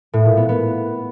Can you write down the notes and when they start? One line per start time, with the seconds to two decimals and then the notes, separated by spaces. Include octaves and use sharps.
0.13 A2
0.25 A#2
0.37 B3
0.49 B3